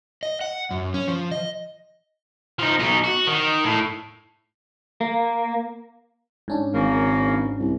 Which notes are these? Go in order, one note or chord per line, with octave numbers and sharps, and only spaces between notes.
D#5
F#5
F#2
C#4
F3
D#5
F3 D#4
B2 D#4
F#4
D#3
A2
A#3
G#2 C#4 D4
G#1 C#3 A#3
C2